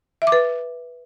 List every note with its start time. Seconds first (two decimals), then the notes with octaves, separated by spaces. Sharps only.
0.22 E5
0.27 D6
0.32 B4